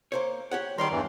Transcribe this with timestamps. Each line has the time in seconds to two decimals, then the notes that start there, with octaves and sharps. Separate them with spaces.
0.12 A#3 C5 C#5
0.51 G4 C#5 F#5
0.78 D#3 G3 A#4 C#5 D5 C6
0.91 E2 G2 E3